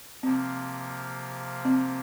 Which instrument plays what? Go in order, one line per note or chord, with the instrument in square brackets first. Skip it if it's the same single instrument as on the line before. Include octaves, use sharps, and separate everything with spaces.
[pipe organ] C3 F3 A#3 [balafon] C4
[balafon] C4